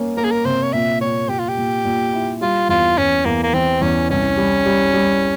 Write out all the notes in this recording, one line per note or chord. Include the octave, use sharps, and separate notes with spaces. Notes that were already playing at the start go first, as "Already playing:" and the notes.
Already playing: A#3 C#4
A#3 A#4
G#4
A#4
C3 C5
C#5
A#2 E5
A#2 C#5
A#2 G4
F4
G4
A#2
A#2
E4
G3 F4
E2 F4
E2 C#4
E2 A#3
A#3
E3 C4
E2 C#4
C2 C#4
G3
G3
G3